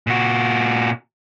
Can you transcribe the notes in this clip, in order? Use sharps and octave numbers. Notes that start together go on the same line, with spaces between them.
A#2 F#4